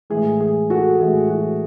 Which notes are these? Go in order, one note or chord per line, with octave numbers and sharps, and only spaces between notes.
A2 E3 G#3 G#4
G#4
F#4 A4
A2 E3 G#3 G#4
F#4